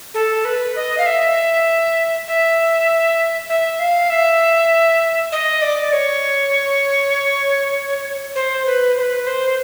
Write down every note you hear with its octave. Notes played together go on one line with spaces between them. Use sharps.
A4
B4
D#5
F5
E5
E5
E5
F5
E5
D#5
D5
C#5
C5
B4
C5
B4
C5